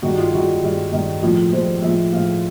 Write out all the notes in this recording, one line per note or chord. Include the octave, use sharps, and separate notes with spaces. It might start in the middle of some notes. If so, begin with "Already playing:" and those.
G2 D#3 G#3 F#4
F4
G2 D#3 G#3 F#4
G2 D#3 G#3
G2 D#3 G#3
A2 F3 G#3
A2 F3 G#3 C5
A2 F3 G#3 E5
A2 F3 G#3 F5